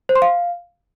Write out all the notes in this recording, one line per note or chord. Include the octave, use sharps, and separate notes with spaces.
C5
C6
F5